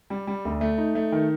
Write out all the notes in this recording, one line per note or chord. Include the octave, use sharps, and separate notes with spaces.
G3
G3
D2
A3
D#4
A3
D#3